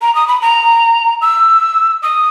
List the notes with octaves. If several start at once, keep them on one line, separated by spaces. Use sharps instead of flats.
A#5
D#6
B5
A#5
E6
D#6